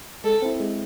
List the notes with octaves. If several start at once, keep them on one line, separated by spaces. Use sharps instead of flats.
G#3 A4
C4 E4
G#3